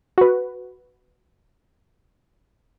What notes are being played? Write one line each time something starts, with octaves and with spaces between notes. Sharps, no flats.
F#4 B4